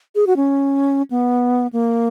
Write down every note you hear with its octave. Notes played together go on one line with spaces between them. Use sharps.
G#4
F#4
C#4
B3
A#3